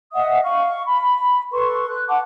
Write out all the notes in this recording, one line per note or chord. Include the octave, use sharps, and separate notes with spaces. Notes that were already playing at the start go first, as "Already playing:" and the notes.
D#5 E5 F#5 D#6
F5 C#6
B5
A4 B4 C6 C#6
F#6
F#5 A5 D6